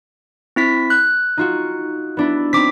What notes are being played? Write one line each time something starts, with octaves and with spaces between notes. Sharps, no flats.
C4 E4 B6
F#6
D#4 F4 F#4
B3 D4 E4
C4 D#4 D6 B6